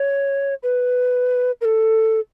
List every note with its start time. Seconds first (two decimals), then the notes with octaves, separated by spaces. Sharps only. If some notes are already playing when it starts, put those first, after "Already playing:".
Already playing: C#5
0.63 B4
1.61 A#4
1.65 A4